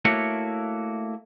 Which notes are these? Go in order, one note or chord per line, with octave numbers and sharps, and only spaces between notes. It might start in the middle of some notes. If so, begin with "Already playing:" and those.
A3 A#3 E4 F#4 C#5